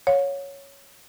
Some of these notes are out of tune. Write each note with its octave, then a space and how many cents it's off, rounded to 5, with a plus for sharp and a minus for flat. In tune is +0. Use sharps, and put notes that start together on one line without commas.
C#5 +0 F5 +45